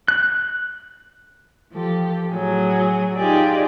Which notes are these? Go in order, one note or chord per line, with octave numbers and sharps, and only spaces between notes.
F#6
F3 G4 A4
A2 F#3 G#4
D#4 F4 G4 G#4 D5